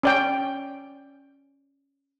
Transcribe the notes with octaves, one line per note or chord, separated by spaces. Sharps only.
C#4 D5 G5